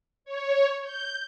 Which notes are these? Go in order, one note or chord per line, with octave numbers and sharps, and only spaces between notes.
C#5
G6